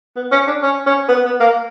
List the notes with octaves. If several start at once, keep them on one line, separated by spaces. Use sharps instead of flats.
B3
C#4
D4
C#4
C#4
B3
B3
A#3